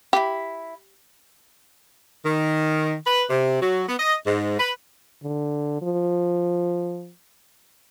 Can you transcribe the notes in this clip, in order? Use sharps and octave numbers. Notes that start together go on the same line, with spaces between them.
E4 F4 G4 B5
D#3
B4
C3
F#3
B3
D#5
G#2
B4
D3
F3